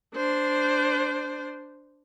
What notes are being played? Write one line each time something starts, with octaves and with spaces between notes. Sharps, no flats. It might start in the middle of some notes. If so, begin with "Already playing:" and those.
D4 C5